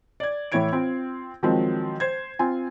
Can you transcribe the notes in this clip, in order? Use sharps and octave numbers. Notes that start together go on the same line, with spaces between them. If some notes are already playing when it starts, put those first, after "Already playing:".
D5 G#6
A2 E3 E4 C#5 G#6 D7
C4 F4
D#3 F3 F#3 G#3 C4
C5 G#6
C4 F4 G#5